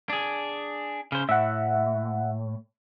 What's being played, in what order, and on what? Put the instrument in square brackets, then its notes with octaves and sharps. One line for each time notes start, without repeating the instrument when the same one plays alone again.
[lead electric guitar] D4 G#4
C#3 C5
[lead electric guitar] A2 [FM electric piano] E5 F#5